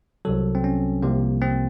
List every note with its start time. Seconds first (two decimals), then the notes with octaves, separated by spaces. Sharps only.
0.25 C2 C3 F#3 A4
0.55 C4
0.64 C#4
1.03 C2 C3 F3 A#3
1.42 C4